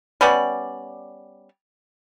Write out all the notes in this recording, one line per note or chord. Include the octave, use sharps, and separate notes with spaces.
G3 B3 C#4 D5